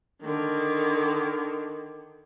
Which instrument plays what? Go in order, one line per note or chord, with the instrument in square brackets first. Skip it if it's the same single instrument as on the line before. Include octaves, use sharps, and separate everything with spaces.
[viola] D3 D#3